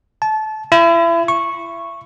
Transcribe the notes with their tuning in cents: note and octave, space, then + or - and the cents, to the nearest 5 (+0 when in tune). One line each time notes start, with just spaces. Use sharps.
A5 -25
E4 +35
C#6 -10